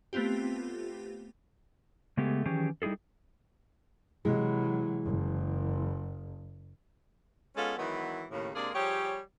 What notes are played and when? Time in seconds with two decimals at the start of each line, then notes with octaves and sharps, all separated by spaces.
0.13 A3 B3 C4 F4 G4
2.17 C#3 G#3 A3 B3 G4 G#4
2.46 D#3 E3 F#3 C#4 G4 G#4
2.82 G3 D#4 E4 G#4 A4
4.25 C3 E3 F#3 G#3 E4
5.05 F#1
7.57 G#3 B3 C#4 F4 A4
7.78 D#3 E3 F#3 G#3 B3 E4
8.31 D#2 A2 C#3
8.55 C3 G#3 A#3 D4 G#4 D5
8.74 F3 G3 G4 G#4 C#5